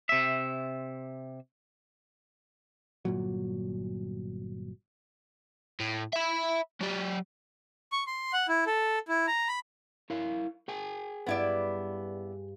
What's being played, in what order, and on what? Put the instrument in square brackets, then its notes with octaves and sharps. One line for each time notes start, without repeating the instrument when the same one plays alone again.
[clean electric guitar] C3 E5
[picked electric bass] G1 A#2 F#3
[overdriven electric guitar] A2
E5 B5
F#3 G4
[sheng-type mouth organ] C#6
C6
F#5
E4
A4
E4
A#5
B5
[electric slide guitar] E4 A#4 F5
G#4 G5 G#5
[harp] G2 [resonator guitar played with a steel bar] B3 E4 D5